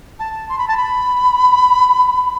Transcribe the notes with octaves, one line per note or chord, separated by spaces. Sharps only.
A5
C6
B5
A5
B5